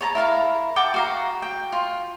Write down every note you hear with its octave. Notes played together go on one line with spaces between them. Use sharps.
C#5 A5 A#5
E4 A#4 F5 A#5
F#5 G5 A5 D6
F#4 F5 A#5
G5
F4